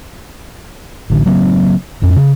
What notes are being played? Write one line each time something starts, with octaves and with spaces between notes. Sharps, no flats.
A1 D3
C#3 F#3 A#3 C4
A1 F2 C#4
C#3